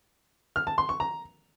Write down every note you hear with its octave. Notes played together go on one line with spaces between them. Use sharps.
F6
A5
C6
C#6
A#5